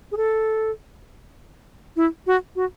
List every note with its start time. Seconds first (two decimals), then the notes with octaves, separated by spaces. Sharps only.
0.12 G#4
0.17 A4
1.96 E4
2.27 F#4
2.56 F#4